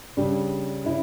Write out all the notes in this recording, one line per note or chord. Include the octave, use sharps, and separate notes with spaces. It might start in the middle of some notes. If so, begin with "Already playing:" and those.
C#3 G3 D4
C#3 E4